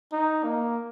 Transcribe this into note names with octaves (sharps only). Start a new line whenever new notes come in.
D#4
A#3